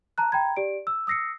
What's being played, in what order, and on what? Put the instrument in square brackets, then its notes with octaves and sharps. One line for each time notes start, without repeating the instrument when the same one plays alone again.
[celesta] A5 A#5 F#6
G5 A#5 B5 G#6
G4 D5 D7
E6
D#6 E6 A#6 C7 C#7